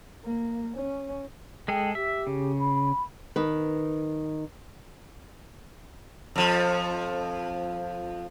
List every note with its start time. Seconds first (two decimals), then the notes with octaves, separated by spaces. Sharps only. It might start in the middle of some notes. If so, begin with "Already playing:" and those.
0.25 A#3
0.77 C#4
1.68 G#3 G#4 A4 G5
1.95 G4 E5
2.27 C#3
2.59 B5
3.36 D#3 B4
6.36 F2 F3